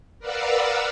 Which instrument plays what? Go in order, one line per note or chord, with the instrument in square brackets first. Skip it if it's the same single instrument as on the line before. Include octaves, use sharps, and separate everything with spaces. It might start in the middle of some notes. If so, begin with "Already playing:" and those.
[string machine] A#4 B4 D5 F5 F#5 E6